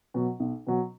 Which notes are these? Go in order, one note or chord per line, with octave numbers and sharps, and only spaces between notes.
B2 F#3
B1
B2 F#3